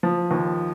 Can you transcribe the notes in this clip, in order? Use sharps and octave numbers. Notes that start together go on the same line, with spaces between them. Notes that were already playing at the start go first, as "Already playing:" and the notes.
F3
D#2